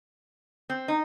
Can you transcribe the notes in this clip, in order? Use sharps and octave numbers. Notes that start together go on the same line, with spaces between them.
C4
D#4